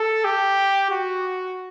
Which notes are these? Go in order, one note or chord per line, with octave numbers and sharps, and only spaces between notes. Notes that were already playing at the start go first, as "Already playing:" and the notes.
Already playing: A4
G4
F#4